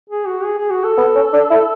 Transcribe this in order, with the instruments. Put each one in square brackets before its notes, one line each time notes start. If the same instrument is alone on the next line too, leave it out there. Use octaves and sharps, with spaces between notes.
[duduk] G#4
F#4
G#4
G#4
F#4
A4
[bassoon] B3
C#4
D4
E4